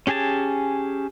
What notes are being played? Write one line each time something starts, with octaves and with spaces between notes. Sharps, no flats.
C#4 G4 G#4 G#5 A5